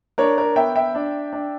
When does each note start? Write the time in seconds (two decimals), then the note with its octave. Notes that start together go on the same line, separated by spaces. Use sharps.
0.18 D4 A#4 C#5
0.38 A#4
0.56 B3 E5 G5
0.76 E5 G5
0.95 D4
1.33 D4